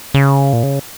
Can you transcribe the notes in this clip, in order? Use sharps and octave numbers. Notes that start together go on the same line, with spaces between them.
C#3
A#2
C#3